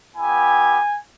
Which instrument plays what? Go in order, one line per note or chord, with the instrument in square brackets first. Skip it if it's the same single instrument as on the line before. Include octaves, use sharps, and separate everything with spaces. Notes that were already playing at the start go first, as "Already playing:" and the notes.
[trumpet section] B3 E4 G4 G#5